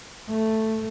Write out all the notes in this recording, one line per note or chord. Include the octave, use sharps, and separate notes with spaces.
A3